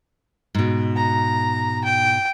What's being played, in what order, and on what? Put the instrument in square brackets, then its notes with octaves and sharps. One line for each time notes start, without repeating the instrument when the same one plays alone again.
[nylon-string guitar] G#2 B2
[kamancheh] A#5
G5